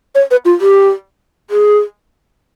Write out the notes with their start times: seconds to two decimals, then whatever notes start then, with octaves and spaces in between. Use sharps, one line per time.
0.15 C#5
0.31 B4
0.45 F4
0.61 G4
1.50 G#4